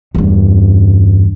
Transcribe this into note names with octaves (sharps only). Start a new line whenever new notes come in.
E2 G2